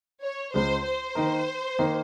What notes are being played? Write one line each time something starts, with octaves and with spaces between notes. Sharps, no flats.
C#5
C#2 C#3 G#3 C5
C5
D#3 A#3 D#4 A#4
D#3 A#3 D#4 A#4